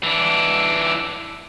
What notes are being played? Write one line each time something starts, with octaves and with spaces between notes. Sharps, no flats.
E3 D4